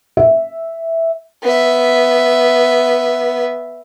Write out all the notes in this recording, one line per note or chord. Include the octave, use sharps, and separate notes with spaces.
E5
B3 E5